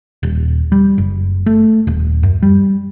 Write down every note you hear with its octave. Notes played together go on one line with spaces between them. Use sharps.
D#1
G3
F#1
A3
D#1
F#2
G3